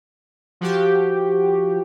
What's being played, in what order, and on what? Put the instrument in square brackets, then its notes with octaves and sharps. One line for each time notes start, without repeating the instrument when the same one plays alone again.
[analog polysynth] F3 F#4 G4